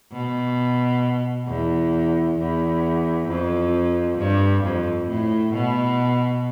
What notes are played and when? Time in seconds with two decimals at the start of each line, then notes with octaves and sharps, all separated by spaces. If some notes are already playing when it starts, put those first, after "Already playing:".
0.12 B2
1.47 E2
2.38 E2
3.28 F2
4.18 G2
4.64 F2
5.08 A2
5.53 B2